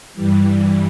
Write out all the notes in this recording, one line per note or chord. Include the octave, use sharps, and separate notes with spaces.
G2 E3 G3